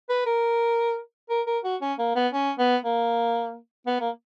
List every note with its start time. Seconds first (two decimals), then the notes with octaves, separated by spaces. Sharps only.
0.09 B4
0.26 A#4
1.29 A#4
1.46 A#4
1.64 F#4
1.81 C#4
1.98 A#3
2.16 B3
2.33 C#4
2.59 B3
2.85 A#3
3.87 B3
4.00 A#3